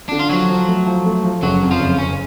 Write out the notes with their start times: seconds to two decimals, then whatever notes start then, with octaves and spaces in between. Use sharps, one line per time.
0.09 D3 D4
0.19 F4
0.29 F3 F#3 F#4
0.49 F3
0.68 A3
0.86 F3
1.06 A3
1.23 F3
1.42 F#1 F#3 F#4
1.62 F2
1.71 F3 F4
1.80 F#1
1.99 F#1 C#4